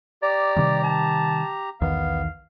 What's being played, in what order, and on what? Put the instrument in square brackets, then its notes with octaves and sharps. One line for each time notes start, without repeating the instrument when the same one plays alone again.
[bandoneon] G4 A#5 [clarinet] D5
[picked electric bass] C3 D#3 G3
[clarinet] A5
[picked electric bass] B1 E2 D#3 [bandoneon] B3 [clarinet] F5